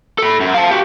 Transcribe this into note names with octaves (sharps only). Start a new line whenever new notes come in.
A4 B5
F#2
F5 A5
F#4 G4